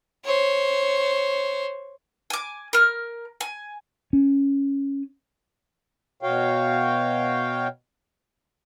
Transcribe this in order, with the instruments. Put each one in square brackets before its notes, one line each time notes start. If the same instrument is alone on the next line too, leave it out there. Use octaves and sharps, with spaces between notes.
[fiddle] C5 C#5
[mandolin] G#5 D6
A#4 F6
G#5
[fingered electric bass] C#4
[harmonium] B2 F#4 C#5 F5 G5